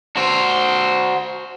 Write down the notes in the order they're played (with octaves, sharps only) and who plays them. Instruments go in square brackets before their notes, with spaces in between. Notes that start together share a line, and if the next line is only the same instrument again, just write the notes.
[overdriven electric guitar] F#4 C5